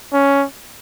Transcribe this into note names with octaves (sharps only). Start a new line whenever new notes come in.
C#4